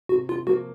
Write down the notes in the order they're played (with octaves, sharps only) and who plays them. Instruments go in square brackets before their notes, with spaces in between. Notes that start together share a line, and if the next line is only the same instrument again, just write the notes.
[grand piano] C3 [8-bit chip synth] F#4
[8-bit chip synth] F4
[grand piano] F3 A#3 [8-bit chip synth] F#4